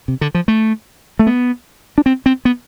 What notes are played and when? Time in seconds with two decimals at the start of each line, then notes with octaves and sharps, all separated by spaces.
0.08 C3
0.21 D3
0.35 F3
0.48 A3
1.19 A3
1.27 B3
1.98 D4
2.06 C4
2.26 C4
2.45 B3